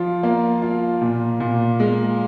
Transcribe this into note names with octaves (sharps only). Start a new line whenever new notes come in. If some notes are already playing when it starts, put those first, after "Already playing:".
Already playing: F3 F4
A#3
F4
A#2
A#2
G#3